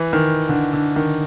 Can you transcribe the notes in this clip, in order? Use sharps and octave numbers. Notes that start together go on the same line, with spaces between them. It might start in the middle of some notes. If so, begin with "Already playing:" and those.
Already playing: E3
D#3
D3
D3
D#3